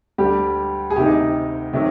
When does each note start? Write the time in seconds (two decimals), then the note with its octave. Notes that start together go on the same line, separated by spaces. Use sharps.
0.18 D2 D3 G3 G4
0.90 G#4
0.96 D2 C3 D#3 G4
1.05 D#4
1.73 C3 D#3 F#3